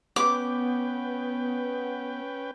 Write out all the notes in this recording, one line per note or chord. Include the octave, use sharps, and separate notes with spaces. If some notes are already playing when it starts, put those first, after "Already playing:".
B3 C#4 B4 G5 D6